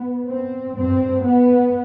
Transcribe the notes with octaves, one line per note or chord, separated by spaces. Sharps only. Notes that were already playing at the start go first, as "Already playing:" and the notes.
Already playing: B3
C4
G2 C4
B3